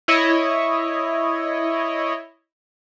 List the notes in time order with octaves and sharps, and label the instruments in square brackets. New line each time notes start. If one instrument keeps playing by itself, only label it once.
[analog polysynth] E4 C#5 D#5